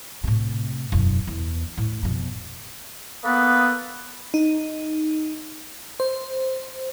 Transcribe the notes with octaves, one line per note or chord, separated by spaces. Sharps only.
A2 C3
E1 F#2
E2
A2
F2 B2
A#3 B3 A4 B4 D#6
D#4
C5